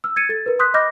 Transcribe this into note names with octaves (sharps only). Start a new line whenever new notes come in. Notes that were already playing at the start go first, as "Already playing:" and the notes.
E6 F6
G#6 A6 C#7 D#7
A4 A6
A#4 B4
C6 D#6 F#6 G6 B6
D#5 B5 D6 F6 G6 A#6